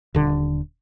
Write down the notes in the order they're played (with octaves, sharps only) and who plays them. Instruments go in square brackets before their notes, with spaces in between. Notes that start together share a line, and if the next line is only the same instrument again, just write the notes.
[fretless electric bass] D#1 D3